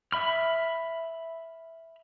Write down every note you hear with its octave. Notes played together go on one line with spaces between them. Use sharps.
E5 B5 F6